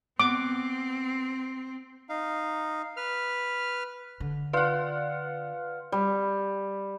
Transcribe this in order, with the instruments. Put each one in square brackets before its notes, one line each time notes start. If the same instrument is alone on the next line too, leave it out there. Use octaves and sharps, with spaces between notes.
[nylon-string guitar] B3 [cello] C4 [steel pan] D6
[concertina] D#4 F5
B4 F6
[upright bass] D3
[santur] F4 F#5 [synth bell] B4 D5
[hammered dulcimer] G3